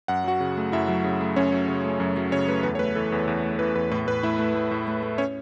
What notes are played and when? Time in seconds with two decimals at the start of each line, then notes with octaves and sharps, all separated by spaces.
0.08 F#2 F#5
0.24 F#3 F#4 F#5
0.40 C#3
0.57 A3
0.72 F#2 E4 E5
0.88 F#3
1.04 C#3
1.21 A3
1.36 F#2 C#4 C#5
1.52 F#3
1.68 C#3
1.85 A3
2.00 F#2
2.17 F#3
2.32 C#3 C#4 C#5
2.48 A3 B4
2.63 E2 B4
2.75 C#5
2.79 A3 B4
2.95 E3 A4
3.12 E2
3.28 E2
3.44 A3
3.59 E3 B4
3.75 E2 B4
3.91 A2 B4
4.07 A2 B4
4.23 A3 E4 E5
4.38 A3
4.55 A2
4.71 A2
4.87 A3
5.03 A3
5.18 C#4 C#5